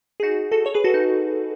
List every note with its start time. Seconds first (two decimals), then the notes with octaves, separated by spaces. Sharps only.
0.20 G#4
0.23 D#4 F#4
0.52 F#4 A4
0.65 A4 C#5
0.74 G#4 B4
0.84 F#4 A4
0.94 D#4